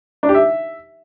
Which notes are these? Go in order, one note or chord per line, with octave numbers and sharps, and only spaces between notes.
D4
G4
E5